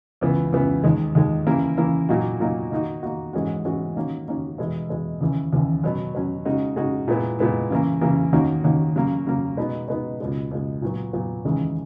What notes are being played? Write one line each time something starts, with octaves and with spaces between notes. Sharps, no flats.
C#2 C#3 E3 B3
C#2 C#3 E3 B3
D#2 D#3 G#3
D#2 D#3 G#3
C#3 E3 A#3 E4
C#3 E3 A#3 E4
A#2 F#3 A#3 D#4 F#4
A#2 F#3 A#3 D#4 F#4
D#3 A#3 D#4 F#4
D#3 A#3 D#4 F#4
G#2 E3 G#3 C#4 F#4
G#2 E3 G#3 C#4 F#4
D#3 A#3 C#4 F#4
D#3 A#3 C#4 F#4
E2 B2 G#3
E2 B2 G#3
D#2 C#3 E3
D#2 C#3 E3
B2 F#3 C#4
B2 F#3 C#4
C#3 G#3 D#4 F#4
C#3 G#3 D#4 F#4
A#2 G#3 B3 E4
A#2 G#3 B3 E4
C#3 E3 A#3
C#3 E3 A#3
D#2 D#3 A#3 C#4 F#4
D#2 D#3 A#3 C#4 F#4
C#3 F#3 A#3
C#3 F#3 A#3
B2 G#3 B3 D#4
B2 G#3 B3 D#4
C#2 B2 G#3
C#2 B2 G#3
A#2 F#3 B3
A#2 F#3 B3
D#2 C#3 E3 G#3 D#4